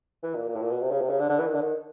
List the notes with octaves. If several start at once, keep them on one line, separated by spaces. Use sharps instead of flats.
E3
A#2
A#2
A2
A#2
B2
C3
C#3
C3
C#3
D3
D3
E3
D#3
D3
D#3